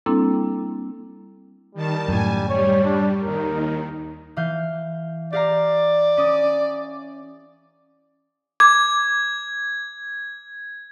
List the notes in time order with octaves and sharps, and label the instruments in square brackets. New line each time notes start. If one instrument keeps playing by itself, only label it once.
[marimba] G3 A#3 C4 D4 E4 A4
[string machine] D#3 A5 [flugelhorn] G3
[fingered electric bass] F#2 A2 [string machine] G#5
[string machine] G3 [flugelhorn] C#5
[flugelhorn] D4
[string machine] D#2 D#3 [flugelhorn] A#4
[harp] E3 F5 G6
[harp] G4 F5 A#5 [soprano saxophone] D5
[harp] C#4 D6 D#6
[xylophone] D6 [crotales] G#6